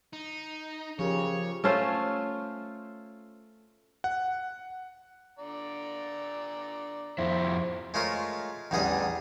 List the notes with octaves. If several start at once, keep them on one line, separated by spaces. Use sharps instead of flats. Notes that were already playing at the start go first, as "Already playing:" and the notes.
D#4
C#3 F3 G4 A#4 C#5
A3 C#4 F4 C5
F#5
D3 D5 A#5
F2 E4 C5
G#3 A3 F4 A#4 C#5
A1 E2 D3 G3 G#4 D#5